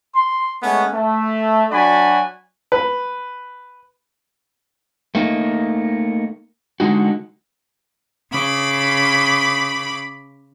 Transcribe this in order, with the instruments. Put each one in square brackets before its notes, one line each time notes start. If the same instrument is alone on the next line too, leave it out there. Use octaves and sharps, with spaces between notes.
[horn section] C6
G#3 A3 B3 C#4
A3
F#3 D4 F#4 D5 G#5 B5
[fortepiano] B4
[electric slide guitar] A3 A#3 D#4
D3 G#3 D#4 F#4
[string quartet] C#3 B5 D6